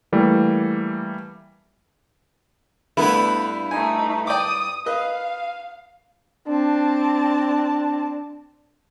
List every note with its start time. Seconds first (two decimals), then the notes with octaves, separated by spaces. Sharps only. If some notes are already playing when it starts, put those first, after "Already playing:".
0.12 E3 G3 A3 A#3
2.97 G2 A3 B3 E4 B4
3.71 A3 D#4 G#5
4.27 D5 G5 D6 D#6
4.86 B4 D#5 F5
6.48 C4 D4 A5